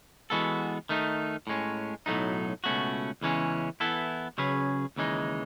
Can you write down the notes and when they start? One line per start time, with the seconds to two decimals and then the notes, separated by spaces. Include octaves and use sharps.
0.30 E3 G#3 B3 F#4 A4
0.89 D#3 A3 D#4
1.47 A2 G#3 C#4
2.06 B1 A2 F#3 A3 D#4
2.64 C#2 B2 A3 C#4 F#4
3.21 E2 C#3 E3 G#3 C#4
3.80 E3 B3 E4 A4
4.38 C#3 F#3 C#4 G#4 B4
4.96 D#2 C#3 E3 G#3 D#4